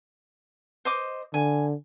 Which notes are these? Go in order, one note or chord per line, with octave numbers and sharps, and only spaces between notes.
C5 D#5 D6
D3 G#5